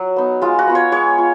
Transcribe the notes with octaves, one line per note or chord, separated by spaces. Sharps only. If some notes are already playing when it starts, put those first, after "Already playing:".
Already playing: F#3 F#4
B3 D#4
G#3 F4
F#4
B3 F4
C#5
G#3 C#5
F4